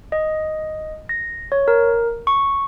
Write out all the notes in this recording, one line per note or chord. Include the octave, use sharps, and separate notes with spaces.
D#5
A#6
C#5
A#4
C#6